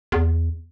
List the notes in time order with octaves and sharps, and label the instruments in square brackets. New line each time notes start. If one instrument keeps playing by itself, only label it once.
[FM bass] E2